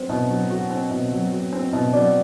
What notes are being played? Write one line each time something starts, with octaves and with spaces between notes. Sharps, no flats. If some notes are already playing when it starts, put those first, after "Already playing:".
Already playing: F#3 C4 F#4 C5
B2
F#3
F#4
C4
B2
F#3
F#4
C4
B2
F#3 D5